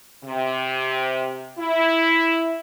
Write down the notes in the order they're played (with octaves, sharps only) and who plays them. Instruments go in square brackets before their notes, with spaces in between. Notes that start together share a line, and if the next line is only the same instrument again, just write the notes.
[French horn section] C3
E4